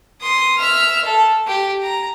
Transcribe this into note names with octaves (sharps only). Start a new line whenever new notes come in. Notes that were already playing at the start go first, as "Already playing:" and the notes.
C6 D#6
E5 F6
A4
G4
A#5